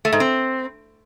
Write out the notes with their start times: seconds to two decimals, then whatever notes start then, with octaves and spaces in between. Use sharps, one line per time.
0.05 A3
0.13 G#2
0.20 C4